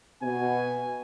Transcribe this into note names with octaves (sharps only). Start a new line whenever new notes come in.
B2 B3 G#5